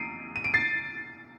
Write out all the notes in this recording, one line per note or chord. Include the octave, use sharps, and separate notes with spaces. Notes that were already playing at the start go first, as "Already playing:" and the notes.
Already playing: C7 D7 D#7
D#7
D7
A6 C7